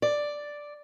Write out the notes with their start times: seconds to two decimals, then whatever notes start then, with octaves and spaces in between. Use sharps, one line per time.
0.02 D5